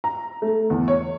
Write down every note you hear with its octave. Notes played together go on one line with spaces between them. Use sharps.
A#5
A3
E2
C#5